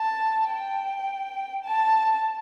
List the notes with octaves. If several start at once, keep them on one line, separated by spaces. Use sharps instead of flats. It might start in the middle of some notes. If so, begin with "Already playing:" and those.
Already playing: A5
G5
A5